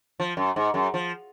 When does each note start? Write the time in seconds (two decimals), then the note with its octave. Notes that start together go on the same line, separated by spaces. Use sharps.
0.20 F3
0.37 F#2
0.56 G#2
0.74 F#2
0.94 F3